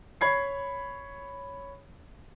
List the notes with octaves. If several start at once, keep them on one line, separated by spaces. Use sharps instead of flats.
C#5 B5 G#6 C7